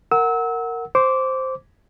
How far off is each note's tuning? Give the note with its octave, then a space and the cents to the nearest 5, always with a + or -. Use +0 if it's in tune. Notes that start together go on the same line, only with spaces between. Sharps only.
A#4 -10 F#5 +0 E6 -30
C5 +0 D6 -20